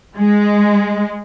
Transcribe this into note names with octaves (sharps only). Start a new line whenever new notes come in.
G#3